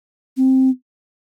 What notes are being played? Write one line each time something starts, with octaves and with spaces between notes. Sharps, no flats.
C4